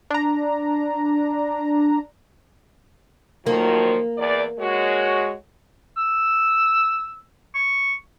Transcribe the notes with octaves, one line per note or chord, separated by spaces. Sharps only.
D4 A#5
D#3 F3 F#3 A#3
E2 D5
G#3 F#4 C#5
E6
C#6